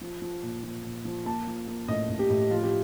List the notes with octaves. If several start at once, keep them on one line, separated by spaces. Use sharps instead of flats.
F3
F3
A#2
F3
A#2
F3
A#3 A5
F3
A#3
A2 D#5
A2
G4
A2
F3 F4
G4